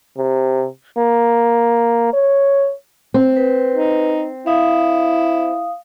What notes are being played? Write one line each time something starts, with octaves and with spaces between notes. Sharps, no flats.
C3
A#3
C#5
C4
B4
D#4
E4 F5 D#6